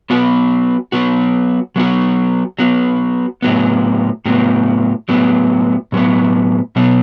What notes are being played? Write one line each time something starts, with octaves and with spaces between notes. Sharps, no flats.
F#3 B3 F#4
F#3 B3 F#4
F#3 B3 F#4
F#3 B3 F#4
A2 F#3 B3
A2 F#3 B3
A2 F#3 B3
A2 F#3 B3
B2 F#3 B3